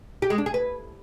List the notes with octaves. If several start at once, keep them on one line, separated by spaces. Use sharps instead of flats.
G4
G#3
D4
G#4
B4